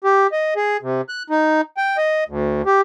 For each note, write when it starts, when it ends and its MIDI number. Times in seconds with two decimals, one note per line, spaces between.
0.04 0.27 67
0.32 0.54 75
0.56 0.77 68
0.82 1.01 48
1.09 1.23 90
1.30 1.61 63
1.77 1.97 79
1.97 2.24 75
2.29 2.62 38
2.66 2.81 67